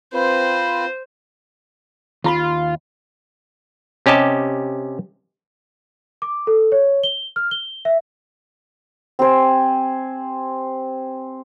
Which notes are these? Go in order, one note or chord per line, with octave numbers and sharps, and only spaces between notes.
C4 F4 B4 C5
D#2 F4 A#5 B5
C3 C#4 G4 D#5 A5
D6
A4
C#5
G7
F6
G7
E5
C4 G4 C5 G#5